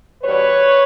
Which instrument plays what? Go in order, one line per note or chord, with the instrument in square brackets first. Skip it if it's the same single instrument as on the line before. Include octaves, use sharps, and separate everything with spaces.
[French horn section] E2 B2 G3 B4 C#5